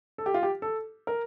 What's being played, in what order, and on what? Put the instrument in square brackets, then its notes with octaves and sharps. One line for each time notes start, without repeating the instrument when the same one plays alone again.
[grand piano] A4
G4
F4
G4
A4
A#4